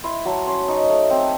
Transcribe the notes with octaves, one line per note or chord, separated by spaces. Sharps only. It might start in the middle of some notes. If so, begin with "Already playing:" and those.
E4 C6
F#3 A5
C#4 C6
D#4 C#6
A3
C4